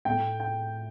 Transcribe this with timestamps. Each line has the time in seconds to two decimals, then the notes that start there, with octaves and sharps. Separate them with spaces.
0.05 A2 A3 G5
0.40 G5